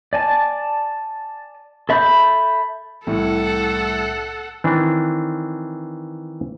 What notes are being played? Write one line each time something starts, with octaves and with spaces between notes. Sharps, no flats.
D5 G#5 A5
A4 E5 B5 D6 G6
C2 A2 E3 A4 F#5
D#3 E3 C4 D4